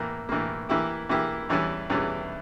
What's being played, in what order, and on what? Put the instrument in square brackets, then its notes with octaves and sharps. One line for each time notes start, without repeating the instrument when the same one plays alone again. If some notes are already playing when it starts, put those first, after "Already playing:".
Already playing: [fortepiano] A2 E3 A#3
A2 E3 A#3
E3 A#3 E4 G4
E3 A#3 E4 G4
E2 E3 G3 C#4 E4
E2 E3 G3 C#4 E4